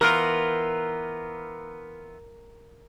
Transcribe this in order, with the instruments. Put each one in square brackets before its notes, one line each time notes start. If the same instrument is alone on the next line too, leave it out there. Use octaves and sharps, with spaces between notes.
[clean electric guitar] E3 B3 F4 [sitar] A#4